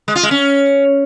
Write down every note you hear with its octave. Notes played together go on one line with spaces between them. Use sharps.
G#3
F4
G#3
C#4